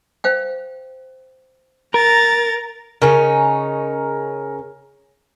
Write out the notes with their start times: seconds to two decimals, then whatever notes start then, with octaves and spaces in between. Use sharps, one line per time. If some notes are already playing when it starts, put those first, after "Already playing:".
0.24 C5 F5 G5
1.94 A#4 A#5 A6
3.02 C#3 C#4 D#4 A#4